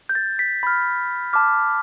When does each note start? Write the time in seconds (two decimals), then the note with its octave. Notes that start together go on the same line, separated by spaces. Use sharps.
0.09 G6
0.15 A6
0.39 B6
0.63 B5 F6
1.33 A5 D6 F6